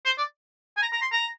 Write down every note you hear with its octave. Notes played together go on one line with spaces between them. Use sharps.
C5
D5
G#5
A#5
A#5
C6
A#5